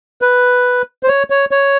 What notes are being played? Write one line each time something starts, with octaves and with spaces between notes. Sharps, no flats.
B4
C5
C#5
C#5
C#5